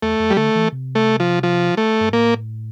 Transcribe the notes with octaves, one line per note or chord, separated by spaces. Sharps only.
E2 A3
F2
G3
D3 A3
E3
C3
A3
F3
F3
A3
G2
A2 A#3